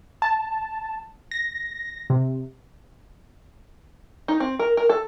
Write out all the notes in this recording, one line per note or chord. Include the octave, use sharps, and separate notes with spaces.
A5
A#6
C3
D#4
C4
A#4
A#4
A4